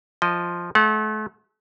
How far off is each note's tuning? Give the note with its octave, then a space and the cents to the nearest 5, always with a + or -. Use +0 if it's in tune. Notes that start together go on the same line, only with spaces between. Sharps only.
F3 +0 D#5 +0
A3 -40 F#5 -35